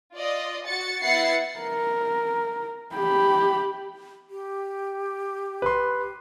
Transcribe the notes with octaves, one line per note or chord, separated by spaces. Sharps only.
F4 D5 D#5
F#4 A6 C#7
B3 E4 F#5 A6 C7 C#7
A#4
G4 B5
G4
B4 C6